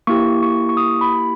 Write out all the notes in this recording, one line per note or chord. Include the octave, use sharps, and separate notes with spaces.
A#3 E4 G4 C#6
C#6
C#6
D#6
B5